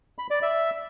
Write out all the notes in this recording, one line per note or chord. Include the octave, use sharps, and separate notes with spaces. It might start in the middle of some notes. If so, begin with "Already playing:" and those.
B5
D5
E5